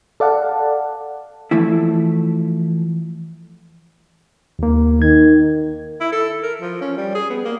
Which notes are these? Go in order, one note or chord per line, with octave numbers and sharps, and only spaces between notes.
A4 D5 F5 F#5 A5
E3 F3 A3 E4
D#2 A#3
D#3 G#6
E4
A4
A#4
F3
C#4
G3
G#4
B3
A#3